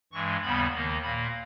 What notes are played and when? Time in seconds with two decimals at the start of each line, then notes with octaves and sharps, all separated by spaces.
0.12 G2 E3 G#3 C#6
0.42 D#2 C#3 G3 B3 B5
0.73 D#2 D#3 A#3
1.03 A#2 A#3 B5